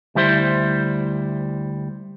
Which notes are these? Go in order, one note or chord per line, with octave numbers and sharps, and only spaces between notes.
D2 G3 E4 C5